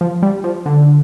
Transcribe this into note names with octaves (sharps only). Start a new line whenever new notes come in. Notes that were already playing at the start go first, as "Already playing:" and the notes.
F3
G3
F3
D3